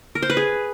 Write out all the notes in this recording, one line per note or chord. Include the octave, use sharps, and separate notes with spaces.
A#4
C5
B4
G#4